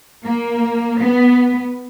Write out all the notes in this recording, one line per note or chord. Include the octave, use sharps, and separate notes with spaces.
A#3
B3